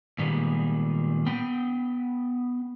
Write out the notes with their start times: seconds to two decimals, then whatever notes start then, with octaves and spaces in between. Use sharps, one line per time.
0.19 A#2 D#3 G3 G#3 A#3 B3
1.26 B3 G5